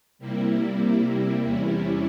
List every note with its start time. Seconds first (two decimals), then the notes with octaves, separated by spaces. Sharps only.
0.19 C3 G3 A#3 E4
1.43 E2 C3 G3 C#4 E4